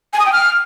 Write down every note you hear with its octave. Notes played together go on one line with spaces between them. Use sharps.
G#5
D#6
G5
F6